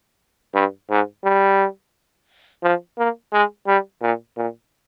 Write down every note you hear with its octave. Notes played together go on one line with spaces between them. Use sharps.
G2
G#2
G3
F3
A#3
G#3
G3
A#2
A#2